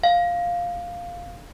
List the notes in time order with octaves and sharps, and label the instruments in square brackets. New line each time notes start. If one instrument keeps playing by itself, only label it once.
[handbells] F5